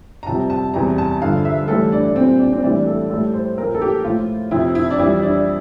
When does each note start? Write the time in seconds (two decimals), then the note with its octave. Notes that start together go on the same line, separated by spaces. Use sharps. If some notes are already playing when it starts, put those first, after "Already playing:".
0.23 A#5
0.27 F2 C3 G3 A5
0.50 A5
0.74 E2 C3 G3 A#5
0.98 A5
1.22 G2 D3 F3 F5
1.45 E5
1.68 A2 E3 G3 A4
1.92 D4
2.16 A#2 G3 C4
2.39 D4
2.53 C4
2.63 A2 E3 G3 D4
2.86 A4
3.10 A2 G3 A4
3.34 C5
3.57 A#2 F3 A#4
3.75 A4
3.82 G4
4.04 A2 F3 F4
4.51 F2 C3 F3 E4
4.75 E4
4.90 D4
4.99 F2 E3 G3 E4
5.22 D4